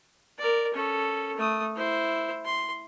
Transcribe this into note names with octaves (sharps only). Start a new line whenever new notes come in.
A#4 D5
C#4 A4
A3 D#6
E4 C5
C6